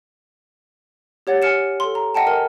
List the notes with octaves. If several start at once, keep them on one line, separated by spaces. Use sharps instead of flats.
G4 C#5 F#5 A6
G#5 F6 C#7 E7
A4 C6
A#5
D#5 F#5 G5 A5
A#4 D#5 G#5